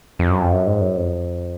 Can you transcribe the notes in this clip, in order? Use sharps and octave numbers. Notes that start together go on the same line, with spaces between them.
F2
F#2
F2
F#2
G#2
F#2
F2